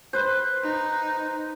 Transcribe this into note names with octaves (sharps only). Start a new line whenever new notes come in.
B4 C5
D#4